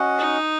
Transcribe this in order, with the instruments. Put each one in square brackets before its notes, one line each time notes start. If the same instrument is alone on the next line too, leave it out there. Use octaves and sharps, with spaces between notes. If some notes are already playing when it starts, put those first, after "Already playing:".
Already playing: [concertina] C#4 F#4 D#5 F#5
[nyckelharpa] D#4